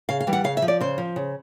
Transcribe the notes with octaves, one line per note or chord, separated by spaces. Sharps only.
C#3 F5
F5
E3 G3
F#5
C#3 F5
E5
F3
D5
C#3 C5
F3
C#3